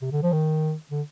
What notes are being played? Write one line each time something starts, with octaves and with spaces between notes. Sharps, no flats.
C3
D3
F3
D#3
D3